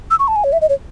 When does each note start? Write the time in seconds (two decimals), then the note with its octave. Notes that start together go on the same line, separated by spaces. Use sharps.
0.11 E6
0.19 C#6
0.28 A5
0.36 G#5
0.44 C#5
0.53 E5
0.61 D#5
0.69 C#5